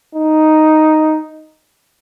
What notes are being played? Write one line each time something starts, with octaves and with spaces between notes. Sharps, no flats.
D#4